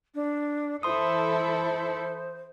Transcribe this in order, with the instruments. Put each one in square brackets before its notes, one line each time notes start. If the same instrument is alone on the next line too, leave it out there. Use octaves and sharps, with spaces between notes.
[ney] D4
[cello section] E3 E4 A4 [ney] C5 [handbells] C6 D#6